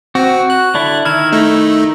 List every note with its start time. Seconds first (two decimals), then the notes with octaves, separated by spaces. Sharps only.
0.15 C4 F#4
0.50 F#6
0.74 D3 D4 E4
1.05 D#3 E4 F6 G#6
1.32 A3 D#4